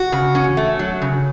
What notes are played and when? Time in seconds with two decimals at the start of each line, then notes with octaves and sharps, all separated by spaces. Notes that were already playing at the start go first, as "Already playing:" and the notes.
Already playing: F#4
0.12 C#3
0.35 C#4
0.57 A3
0.79 F#3
1.02 C#3